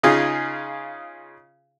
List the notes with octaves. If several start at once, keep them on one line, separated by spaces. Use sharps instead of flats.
C#3 D#4 F4 G#4